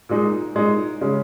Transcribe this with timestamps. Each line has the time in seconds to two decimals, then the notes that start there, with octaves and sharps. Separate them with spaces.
0.09 A#2 G#3 D#4
0.55 A#2 G#3 D#4
1.01 C#3 G#3 C#4